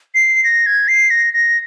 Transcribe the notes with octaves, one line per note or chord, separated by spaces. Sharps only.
C7
A#6
G#6
C7
A#6
A#6